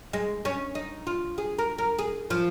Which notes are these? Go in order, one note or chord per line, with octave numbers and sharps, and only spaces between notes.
G#3
C#4
D#4
F4
G#4
A#4
A#4
G#4
F3